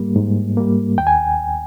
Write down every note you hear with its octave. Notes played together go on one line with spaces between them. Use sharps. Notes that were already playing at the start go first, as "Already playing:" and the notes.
Already playing: G#2 G3 A#3
G#2
G3 A#3
D#2 G5
G#5